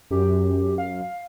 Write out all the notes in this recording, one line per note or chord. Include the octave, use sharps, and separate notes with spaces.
F#2 G4
F5